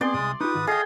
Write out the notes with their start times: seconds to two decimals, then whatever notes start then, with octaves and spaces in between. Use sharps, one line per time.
0.01 B3 C4 G#4 D5 C6
0.14 C2 G#2 G#3 D#6
0.41 D#4 F4 G4 B4 D#6
0.54 G#2 D#3 F#4
0.67 G#4 A4 D#5 F5 G5 D#6